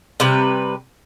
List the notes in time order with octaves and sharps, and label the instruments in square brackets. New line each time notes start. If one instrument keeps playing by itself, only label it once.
[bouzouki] C3 G3 B4